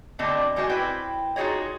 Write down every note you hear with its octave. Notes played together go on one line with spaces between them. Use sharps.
B2 D3 A3 C4 D4 D#5
A2 G3 G#3 F#4 C5 D#5
C4 E4 B4 C5 G5
D#4 F4 F#4 G#4 C#5 D#5